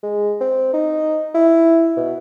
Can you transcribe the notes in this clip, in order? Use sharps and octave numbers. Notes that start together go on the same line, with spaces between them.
G#3
C4
D#4
E4
B2